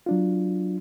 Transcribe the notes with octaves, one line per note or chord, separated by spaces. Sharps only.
F#3 D4 F4